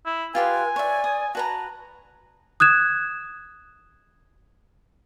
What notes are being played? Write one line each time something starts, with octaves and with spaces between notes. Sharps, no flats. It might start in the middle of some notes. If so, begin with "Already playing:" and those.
E4
F4 G4 B4 G#5 C6
C#5 D5 E5
D#6
F#4 B4 A5 A#5
D#6 F#6 G#6 E7